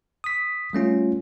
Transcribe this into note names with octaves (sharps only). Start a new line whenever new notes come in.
D#6 B6
G3 A3 C#4 F4